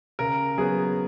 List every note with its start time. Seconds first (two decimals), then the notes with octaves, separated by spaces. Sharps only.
0.19 C#3 A#4
0.58 F#3 B3 G#4